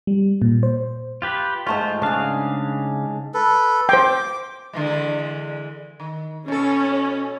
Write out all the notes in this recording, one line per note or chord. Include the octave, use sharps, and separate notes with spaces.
G3
A#2
C5
F4 G4 B4
G#2 A3 F4 C5 C#6
C#3 D4 G#4 F5
A4 B4
C5 G5 D6
D3 E3 G#3
D#3
B2 C#4 A4